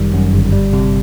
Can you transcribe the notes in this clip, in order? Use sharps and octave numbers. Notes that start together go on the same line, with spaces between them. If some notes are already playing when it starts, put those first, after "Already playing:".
Already playing: G1 F#2 D#3 G3
F#2
G1
G3
C3